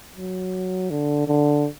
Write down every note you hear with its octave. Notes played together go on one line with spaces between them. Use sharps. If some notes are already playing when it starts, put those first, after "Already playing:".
F#3
D3
D3